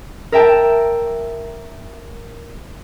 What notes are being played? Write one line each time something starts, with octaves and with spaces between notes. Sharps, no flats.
A#4 E5 G5 A5